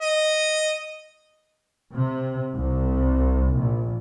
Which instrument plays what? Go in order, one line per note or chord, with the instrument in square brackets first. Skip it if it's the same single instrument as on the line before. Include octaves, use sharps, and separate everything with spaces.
[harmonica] D#5
[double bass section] C3
C2
A#1